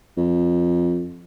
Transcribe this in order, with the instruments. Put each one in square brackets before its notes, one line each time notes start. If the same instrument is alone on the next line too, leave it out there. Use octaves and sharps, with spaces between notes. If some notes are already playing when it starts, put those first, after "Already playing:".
[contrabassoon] F2